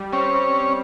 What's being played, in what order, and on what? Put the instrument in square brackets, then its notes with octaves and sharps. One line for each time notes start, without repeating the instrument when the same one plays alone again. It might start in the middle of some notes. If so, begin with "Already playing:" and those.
Already playing: [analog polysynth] G3
[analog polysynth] C4 [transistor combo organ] C#4